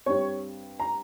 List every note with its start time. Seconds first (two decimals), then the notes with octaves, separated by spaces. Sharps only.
0.06 G2 G3 C4 C#5
0.80 A#5